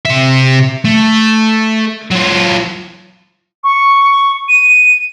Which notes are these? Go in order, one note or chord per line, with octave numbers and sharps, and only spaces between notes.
C3 E5
A3
F#3 F4
C#6
D#7